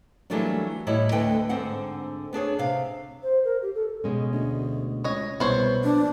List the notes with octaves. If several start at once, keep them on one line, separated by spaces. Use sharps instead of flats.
E3 F#3 G3 A3 A#3 D4
A2 G3 E4 C#5 D#5
D2 D3 A3 B4 D#5 G5
G#2 D3 C4 F#5
B3 D4 G#4 C#5
C3 F5
C5
A#4
G4
A4
B2 G#3 C#4
D2
C#2 C#5 D#5
C2 B2 B3 C5 C#5
A#1 D4